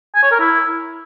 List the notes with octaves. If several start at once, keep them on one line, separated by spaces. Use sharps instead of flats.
G#5
C#5
A#4
E4